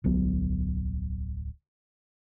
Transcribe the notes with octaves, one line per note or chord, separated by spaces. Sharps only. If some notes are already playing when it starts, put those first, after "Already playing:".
D1 B1 F#3 B3